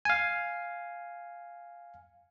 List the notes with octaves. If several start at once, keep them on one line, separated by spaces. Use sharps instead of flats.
F5 G#5